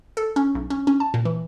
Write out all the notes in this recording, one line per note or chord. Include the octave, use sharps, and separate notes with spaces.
A4
C#4
B1
C#4
C#4
A5
A#2
E3